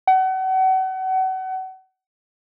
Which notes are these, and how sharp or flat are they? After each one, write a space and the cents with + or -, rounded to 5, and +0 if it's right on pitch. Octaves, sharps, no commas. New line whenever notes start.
F#5 +35